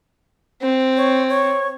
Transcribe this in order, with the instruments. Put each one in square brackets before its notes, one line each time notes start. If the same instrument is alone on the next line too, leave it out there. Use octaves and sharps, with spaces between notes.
[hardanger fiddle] C4
[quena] C#5
C#5